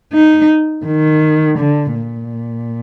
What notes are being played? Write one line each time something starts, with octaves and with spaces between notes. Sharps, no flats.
D#4
D#3
D3
A#2